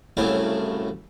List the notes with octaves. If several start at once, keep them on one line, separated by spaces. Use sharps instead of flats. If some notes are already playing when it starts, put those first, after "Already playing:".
C2 A2 C#3 F#3 E4 F5